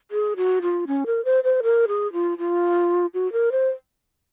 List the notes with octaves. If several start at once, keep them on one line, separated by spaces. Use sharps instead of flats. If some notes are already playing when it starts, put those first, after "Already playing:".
G#4
F#4
F4
C#4
A#4
C5
C5
A#4
G#4
F4
F4
F#4
A#4
C5